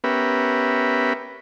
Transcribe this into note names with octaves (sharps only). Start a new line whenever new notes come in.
B3 C#4 G4 A#4 B4 E5